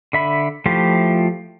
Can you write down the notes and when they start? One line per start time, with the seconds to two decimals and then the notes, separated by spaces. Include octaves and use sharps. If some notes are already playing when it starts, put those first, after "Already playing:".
0.13 D3 E5 B5
0.66 F3 A3 E4 F4 G4